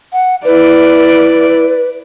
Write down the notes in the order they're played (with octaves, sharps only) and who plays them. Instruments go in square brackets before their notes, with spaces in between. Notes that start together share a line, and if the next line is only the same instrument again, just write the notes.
[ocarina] F#5
[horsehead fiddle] E4 D5 [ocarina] B4